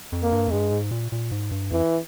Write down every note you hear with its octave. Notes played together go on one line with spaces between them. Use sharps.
F2
A#3
G2
F2
G2 G#3
G#2
A#2
A#2
G#2
G2
F2 E3